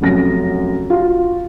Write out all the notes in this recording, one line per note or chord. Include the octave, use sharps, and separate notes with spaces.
F1 F#2 A#6
F4 F#4